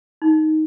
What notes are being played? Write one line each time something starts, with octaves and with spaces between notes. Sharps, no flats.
D#4